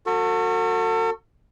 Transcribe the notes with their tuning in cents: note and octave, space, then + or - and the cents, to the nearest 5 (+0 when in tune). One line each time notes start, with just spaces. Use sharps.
F#4 -20 A4 +40